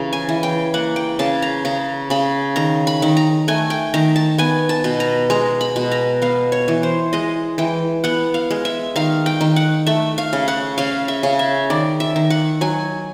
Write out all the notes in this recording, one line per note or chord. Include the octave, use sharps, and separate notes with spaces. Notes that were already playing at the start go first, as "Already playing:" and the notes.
Already playing: C#3 E3 A#5
G#5
E3
G5
A#3 F#5
G5
C#3 A5
A#5
C#3 A#5
C#3 B5
D#3 A#5
B5
D#3
A#5
A3 G#5
G5
D#3 A#5
A5
B3 G#5
A5
B2
A#5
G#3 A#5
B5
B2
A#5
B3 F5
C#5
E3
C5
G#3 D#5
E3 G5
B3 F#5
F5
G#3
E5
D#3 F5
G5
D#3
F#5
A3 E5
F5
C#3
F#5
C#3 F5
E5
C#3
E5
D#3 D5
E5
D#3
F#5
F#3 G#5